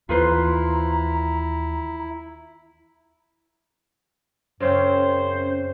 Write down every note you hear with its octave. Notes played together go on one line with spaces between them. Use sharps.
D#2 E3 E4 F4 B4 C5 A#5
F#2 C#3 C4 C#4 C5